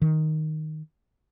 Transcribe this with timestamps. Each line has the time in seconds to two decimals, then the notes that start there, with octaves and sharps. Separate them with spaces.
0.02 D#3